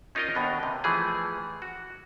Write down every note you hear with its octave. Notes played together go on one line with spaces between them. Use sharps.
C#4 D#4 F4 A#4 D5 D#5
D#2 B2 B3 D4
C3
E3 F3 A3 G#4
F#4